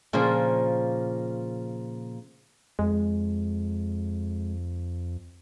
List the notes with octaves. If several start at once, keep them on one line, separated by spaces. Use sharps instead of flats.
A#2 C#3 F3 A#3
F2 G#3